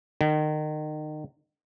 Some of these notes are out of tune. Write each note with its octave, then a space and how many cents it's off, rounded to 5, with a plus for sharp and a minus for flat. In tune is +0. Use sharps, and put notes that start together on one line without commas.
D#3 -30